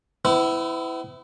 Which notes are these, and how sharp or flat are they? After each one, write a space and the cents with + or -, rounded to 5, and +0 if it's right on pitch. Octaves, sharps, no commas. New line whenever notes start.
B3 +45 E4 +0